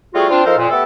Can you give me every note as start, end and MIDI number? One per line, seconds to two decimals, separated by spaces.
0.14 0.27 55
0.14 0.27 57
0.14 0.27 60
0.14 0.27 65
0.14 0.27 66
0.14 0.27 68
0.29 0.44 60
0.29 0.44 62
0.29 0.44 65
0.45 0.55 53
0.45 0.55 63
0.45 0.55 65
0.45 0.55 69
0.45 0.55 70
0.45 0.55 72
0.58 0.67 41
0.58 0.67 46
0.70 0.84 57
0.70 0.84 59
0.70 0.84 67
0.70 0.84 69